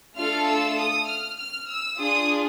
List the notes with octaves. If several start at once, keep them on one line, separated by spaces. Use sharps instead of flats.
A3 D4 F4 A4 F6
E6
D#6
F6
F6
E6
D4 F4 G#4 D#6